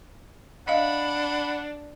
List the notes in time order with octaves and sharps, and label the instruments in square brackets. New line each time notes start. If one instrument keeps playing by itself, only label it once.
[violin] D4 [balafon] D#5 F5 [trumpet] F#5 [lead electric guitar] B5